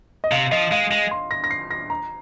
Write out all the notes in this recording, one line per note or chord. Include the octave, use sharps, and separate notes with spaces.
D#5
C3 F5
F3 D#5
G#3 F5
G#3
C6
A#6
A#6
C7
A#6
A#5